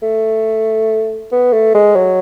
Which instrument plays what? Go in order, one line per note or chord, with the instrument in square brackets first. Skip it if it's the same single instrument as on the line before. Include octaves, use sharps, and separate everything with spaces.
[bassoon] A3
B3
A3
G#3
F#3